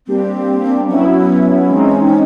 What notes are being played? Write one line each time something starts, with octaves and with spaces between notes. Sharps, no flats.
G3 A#3 C4 D4 G4
F#3 B3 C#4 E4
E3 G#3 C4 D#4